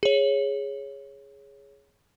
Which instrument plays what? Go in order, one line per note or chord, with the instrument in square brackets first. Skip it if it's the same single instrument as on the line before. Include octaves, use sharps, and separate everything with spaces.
[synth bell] G#4 C#5